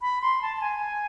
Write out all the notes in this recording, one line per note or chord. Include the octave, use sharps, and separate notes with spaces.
B5
C6
A5
A5
G#5